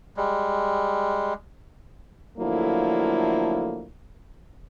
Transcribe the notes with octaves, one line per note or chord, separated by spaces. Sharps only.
G3 G#3
D3 F3 F#3 A3 A#3 E4